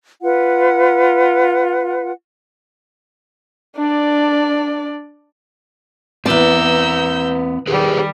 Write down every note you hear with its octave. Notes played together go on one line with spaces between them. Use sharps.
F4 B4 F#5
D4 D5
E2 C4 B4 D5 A#5 E6 G6
D#3 G3 G4 G#4 B4